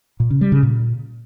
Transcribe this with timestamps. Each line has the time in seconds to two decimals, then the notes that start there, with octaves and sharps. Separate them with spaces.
0.20 A#2
0.30 C#3
0.41 G3
0.52 C#3
0.63 A#2